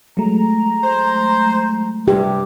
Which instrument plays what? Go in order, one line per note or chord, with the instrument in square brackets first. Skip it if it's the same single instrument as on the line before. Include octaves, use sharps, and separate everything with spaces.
[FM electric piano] F#3 G#3 A3 [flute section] A#5
[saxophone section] C5
[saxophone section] G2 C3 [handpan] G4